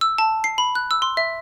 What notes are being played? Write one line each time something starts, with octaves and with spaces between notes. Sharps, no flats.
E6
A5
C7
B5
F#6
E6
C6
E5